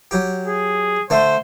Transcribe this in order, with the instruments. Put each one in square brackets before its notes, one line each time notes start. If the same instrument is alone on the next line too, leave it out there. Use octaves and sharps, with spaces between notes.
[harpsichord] F#3 G4
[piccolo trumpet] G#4
[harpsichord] D3 A3 [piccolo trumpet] C5